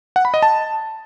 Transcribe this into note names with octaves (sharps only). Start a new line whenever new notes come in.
F#5
B5
D#5
A5